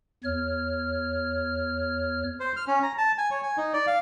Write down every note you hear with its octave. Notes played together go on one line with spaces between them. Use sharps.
E2 C#5 F6
C5
F6
C#4
A#5
A5
G#5
C#5
G#5
D#4
D5
F5